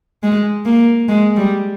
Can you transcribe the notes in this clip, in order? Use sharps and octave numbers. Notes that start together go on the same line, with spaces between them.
G#3
A#3
G#3
G3